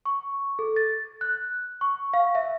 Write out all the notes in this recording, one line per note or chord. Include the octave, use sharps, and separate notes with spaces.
C#6
A4
A6
F#6
C#6
F5
E5